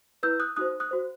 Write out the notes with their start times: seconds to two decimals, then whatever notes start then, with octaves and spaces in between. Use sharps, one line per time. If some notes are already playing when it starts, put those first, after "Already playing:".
0.23 E4 B4 E6 G6
0.40 D#6 F#6
0.56 D#4 F#4 C5 D#6 F#6
0.80 D#6 F#6
0.91 F#4 C5